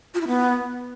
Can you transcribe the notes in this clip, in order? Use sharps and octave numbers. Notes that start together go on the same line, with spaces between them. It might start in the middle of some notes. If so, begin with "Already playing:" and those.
F4
E4
B3